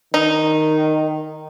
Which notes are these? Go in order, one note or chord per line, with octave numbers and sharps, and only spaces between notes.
D#3 D#4